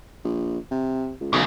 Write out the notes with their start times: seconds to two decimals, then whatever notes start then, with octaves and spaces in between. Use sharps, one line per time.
0.25 A#1
0.71 C3
1.21 C#2
1.33 B1 E2 C#3